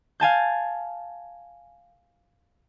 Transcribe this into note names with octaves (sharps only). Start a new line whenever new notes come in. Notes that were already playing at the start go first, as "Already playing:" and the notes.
F5 G#5 A5 G6